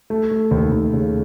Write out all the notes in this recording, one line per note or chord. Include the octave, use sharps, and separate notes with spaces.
A3
A3
D#2
D#2
C#3